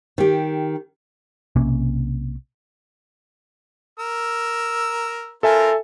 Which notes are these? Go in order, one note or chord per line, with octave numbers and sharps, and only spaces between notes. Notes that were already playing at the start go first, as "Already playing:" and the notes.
D#3 G4
B1 C3 A#3 C#4
A#4 E6
C4 F4 A4 A#4 E5 G#5